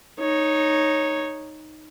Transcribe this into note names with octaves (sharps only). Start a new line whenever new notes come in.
D#4 C#5